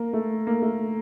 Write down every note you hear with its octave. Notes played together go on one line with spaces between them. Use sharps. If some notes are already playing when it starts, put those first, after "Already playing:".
Already playing: A#3
A3
A#3
A3